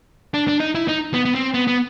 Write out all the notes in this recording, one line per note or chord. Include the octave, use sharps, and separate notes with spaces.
D4
D4
D#4
E4
D#4
B3
B3
C4
B3
B3